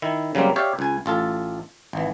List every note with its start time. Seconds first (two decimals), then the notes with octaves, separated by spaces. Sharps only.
0.02 D#3 E4
0.35 C#3 F#3 G3 A#3 C4
0.56 G4 C#5 D5 E5 F5
0.79 C#2 G#5
1.06 A1 F4 A4 A5
1.93 G#1 E3